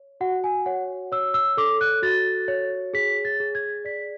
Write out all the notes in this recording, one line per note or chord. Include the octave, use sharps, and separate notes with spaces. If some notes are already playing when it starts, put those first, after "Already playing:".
Already playing: C#5
F#4 F#5
G#5
C#5 F#5
C#5 E6
E6
A4 D6
F#6
F#4 A6
C#5
G#4 B6
A6
G#4
G#6
D5 B6